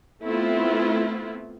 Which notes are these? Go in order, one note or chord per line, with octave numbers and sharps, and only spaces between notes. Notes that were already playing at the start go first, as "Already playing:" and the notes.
A3 B3 C4 E4 F4